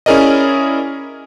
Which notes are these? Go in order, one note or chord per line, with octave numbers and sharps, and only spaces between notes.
C#4 E4 G#4 A#4 D5 D#5